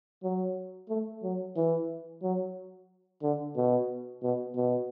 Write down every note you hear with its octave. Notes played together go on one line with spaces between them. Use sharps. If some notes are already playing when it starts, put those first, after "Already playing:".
F#3
A3
F#3
E3
F#3
D3
B2
B2
B2